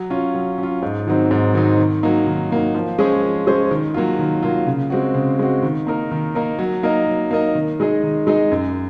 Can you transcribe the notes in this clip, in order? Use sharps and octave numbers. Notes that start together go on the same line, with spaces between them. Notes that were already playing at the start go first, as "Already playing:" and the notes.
Already playing: F#3
C#4 F4
F#3
C#4
F4
G#2
D#3 F#3 C4 D#4
G#2
D#3 F#3 C4 D#4
D#3
F#3 A#3 D#4
D#3
F#3 A#3 D#4
F3
G#3 C#4 G#4 C5
F3
G#3 C#4 G#4 C5
D#3
F#3 A#3 F4
D#3
F#3 A#3 F4
C#3
G#3 C4 F#4
C#3
G#3 C4 F#4
D#3
A#3 D#4 A#4
D#3
A#3 D#4 A#4
F#3
A#3 D#4 A#4 D#5
F#3
A#3 D#4 A#4 D#5
D#3
G#3 D#4 G#4 D#5
D#3
G#3 D#4 G#4 D#5
F#2